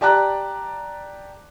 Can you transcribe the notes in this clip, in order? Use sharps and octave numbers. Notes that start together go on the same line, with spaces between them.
G4 D5 A5 A#5 F#6